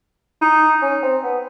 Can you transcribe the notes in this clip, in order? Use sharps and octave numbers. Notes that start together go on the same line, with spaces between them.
D#4
C#4
C4
B3